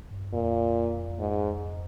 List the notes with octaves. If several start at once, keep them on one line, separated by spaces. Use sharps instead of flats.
G2
F2 A#2
G#2